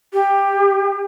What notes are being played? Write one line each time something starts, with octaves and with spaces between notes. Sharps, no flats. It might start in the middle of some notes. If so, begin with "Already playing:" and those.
G4